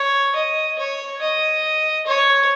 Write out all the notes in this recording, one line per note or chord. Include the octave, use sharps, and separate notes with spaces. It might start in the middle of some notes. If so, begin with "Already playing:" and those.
Already playing: C#5
D#5
C#5
D#5
C#5